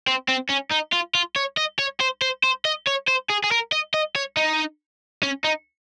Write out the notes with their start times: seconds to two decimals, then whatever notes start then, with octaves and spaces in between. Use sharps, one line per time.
0.07 C4
0.29 C4
0.50 C#4
0.72 D#4
0.93 F4
1.15 F4
1.36 C#5
1.57 D#5
1.79 C#5
2.01 C5
2.22 C5
2.44 C5
2.65 D#5
2.87 C#5
3.08 C5
3.30 G#4
3.44 G#4
3.51 A#4
3.72 D#5
3.94 D#5
4.16 C#5
4.37 D#4
5.23 C#4
5.44 D#4